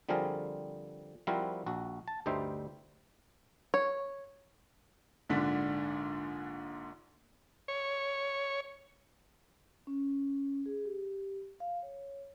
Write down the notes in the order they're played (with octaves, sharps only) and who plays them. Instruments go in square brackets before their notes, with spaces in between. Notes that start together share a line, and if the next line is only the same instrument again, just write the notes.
[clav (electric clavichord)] D3 F3 G3 C4 G#4 A#4
F3 G3 C4 E4 F#4 A#4
A#1 F#4
A5
D2 G2 G3 D#4 C5 E5
[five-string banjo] C#5
[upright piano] A#1 G#2 D3 D4 B6
[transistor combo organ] C#5
[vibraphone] C#4
G#4
G4
F5
C#5